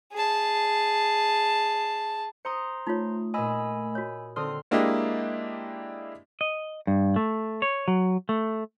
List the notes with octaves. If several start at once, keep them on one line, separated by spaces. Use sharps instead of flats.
G#4 A5
C5 A#5 C6 D#6 C#7
A3 D#4 F4 C#5
A#2 D#5 G#5 B5 E6
F#4 C#5
D3 C4 A4 C6 D#6 F6
G#3 A#3 D4 E4 G4 D#5
D#5
G2
A3
C#5
F#3
A3